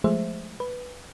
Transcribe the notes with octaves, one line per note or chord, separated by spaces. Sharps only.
F3 G#3 A3 G#4 C5 E5
B4